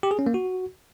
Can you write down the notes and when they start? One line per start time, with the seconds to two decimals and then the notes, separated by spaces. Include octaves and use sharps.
0.03 G4
0.11 G#4
0.19 C#4
0.26 A#3
0.34 F#4